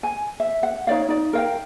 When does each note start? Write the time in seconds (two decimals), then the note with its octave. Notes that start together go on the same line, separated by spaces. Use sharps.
0.03 G#5
0.40 E5
0.63 F#5
0.87 D#4 C#5 D5 F5
1.09 D#4 D5
1.33 A#4 F5 G5